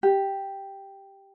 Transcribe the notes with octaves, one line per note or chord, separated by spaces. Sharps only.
G4